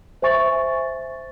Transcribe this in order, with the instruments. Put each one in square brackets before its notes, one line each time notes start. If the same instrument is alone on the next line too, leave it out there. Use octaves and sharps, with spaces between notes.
[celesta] C5 E5 G#5 C#6 A6